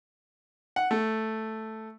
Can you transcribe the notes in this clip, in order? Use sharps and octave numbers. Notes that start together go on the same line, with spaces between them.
F#5
A3